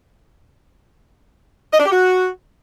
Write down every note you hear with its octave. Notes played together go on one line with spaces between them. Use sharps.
D#5
D4
G4
F#4